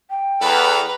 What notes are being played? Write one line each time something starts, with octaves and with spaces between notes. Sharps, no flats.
G5
E2 A4 B4 A#5